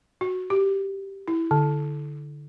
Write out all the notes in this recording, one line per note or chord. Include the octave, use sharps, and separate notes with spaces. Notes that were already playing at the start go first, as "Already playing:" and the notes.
F#4
G4
E4
D3